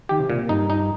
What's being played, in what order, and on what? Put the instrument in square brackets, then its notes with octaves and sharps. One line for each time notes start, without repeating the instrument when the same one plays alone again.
[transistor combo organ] D#3 [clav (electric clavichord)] G4
[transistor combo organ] C3
[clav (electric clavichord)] A#2
[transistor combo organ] G2 [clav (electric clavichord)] D#4
[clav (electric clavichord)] D#4